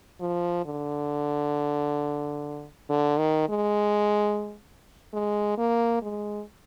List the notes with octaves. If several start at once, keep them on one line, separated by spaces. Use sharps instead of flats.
F3
D3
D3
D#3
G#3
G#3
A#3
G#3